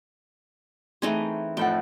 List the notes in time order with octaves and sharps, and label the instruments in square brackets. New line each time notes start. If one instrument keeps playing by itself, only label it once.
[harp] E3 C4 [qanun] A3 D#4 G#4
[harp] F2 A2 F#5 [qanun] G5